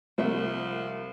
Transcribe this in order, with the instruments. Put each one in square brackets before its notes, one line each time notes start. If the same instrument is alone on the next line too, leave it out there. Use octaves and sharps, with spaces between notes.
[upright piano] C2 [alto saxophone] F3 [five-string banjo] A3 E5